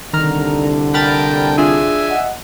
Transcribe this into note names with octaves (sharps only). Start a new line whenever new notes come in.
C2 D3 D#3 A#5 F6
A#4 G5 A5 B5 F6 A6
D4 F4 G#4 E5 G#5
D#5 F#5